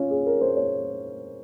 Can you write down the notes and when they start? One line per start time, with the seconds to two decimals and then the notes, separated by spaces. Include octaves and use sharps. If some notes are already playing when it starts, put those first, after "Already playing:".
Already playing: C#4 F4
0.11 G#4
0.26 A#4
0.41 C5
0.57 C#5